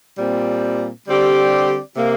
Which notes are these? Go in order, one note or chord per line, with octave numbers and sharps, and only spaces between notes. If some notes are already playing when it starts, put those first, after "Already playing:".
A#2 G3 C4
D3 G3 C4 G4 D5
C3 A#3